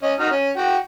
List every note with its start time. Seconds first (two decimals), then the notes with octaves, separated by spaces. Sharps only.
0.03 C#4 D#5
0.20 D#4 F#4 F6
0.31 C#4
0.57 F#4 G5